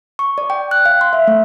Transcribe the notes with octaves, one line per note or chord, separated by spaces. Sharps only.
C#6
D5
G5
F#6
F5
C6
E5
A3